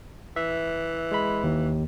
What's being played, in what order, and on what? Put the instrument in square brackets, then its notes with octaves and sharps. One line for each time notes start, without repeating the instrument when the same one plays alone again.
[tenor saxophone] E3 [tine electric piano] E5
[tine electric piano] G#3 B5
D#2